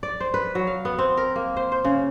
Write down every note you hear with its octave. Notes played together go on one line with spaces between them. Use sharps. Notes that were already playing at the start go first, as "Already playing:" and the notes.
D5
C5
B4
F#3
F5
B3
C4
A#4
A#3
C5
C5
C#3